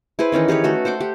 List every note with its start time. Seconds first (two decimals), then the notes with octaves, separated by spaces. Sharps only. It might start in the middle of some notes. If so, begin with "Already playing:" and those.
0.19 E4 G#4 B4 C5
0.32 D#3 E3 C#4 D#4
0.48 G4 G#4 B4 C#5
0.64 A3 F#4 A4
0.85 C5 F#5 G5 D6
1.01 G4